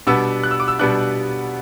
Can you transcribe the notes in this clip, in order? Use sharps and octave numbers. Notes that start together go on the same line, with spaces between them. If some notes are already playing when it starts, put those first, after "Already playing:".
B2 G3 B3 D4 E6
F#6
E6
D6
E6
B2 G3 B3 D4 F#6